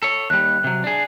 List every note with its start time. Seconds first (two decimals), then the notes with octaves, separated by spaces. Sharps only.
0.03 A4 C#5
0.30 D#2 G3 F#6
0.64 C3 F#3
0.84 D4 G#4